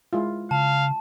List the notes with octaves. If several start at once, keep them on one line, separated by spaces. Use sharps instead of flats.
G#3 E4 F4
C#3 F5 A5